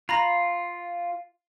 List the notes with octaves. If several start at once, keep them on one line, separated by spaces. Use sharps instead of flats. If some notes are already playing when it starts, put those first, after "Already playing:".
F4 A#5 B5 A#6